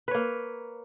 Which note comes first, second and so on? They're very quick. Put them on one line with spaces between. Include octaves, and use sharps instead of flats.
B4 C#5 A#3